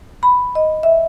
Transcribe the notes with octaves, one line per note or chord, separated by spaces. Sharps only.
B5
D#5
E5